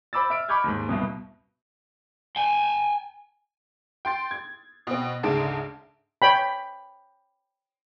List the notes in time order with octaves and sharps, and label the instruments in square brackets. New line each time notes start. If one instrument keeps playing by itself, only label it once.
[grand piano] C5 B5 D6 E6 A6
E5 E6 F6 D7
B5 C#6 D6 F6 G6 G#6
D#2 G#2
C2 G2 B2
[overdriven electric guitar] G5 G#5
[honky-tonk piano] G5 C6 A6
G#6
B2 C4
D2 G#2 C#3 A5 D7
[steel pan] C#5 G5 B5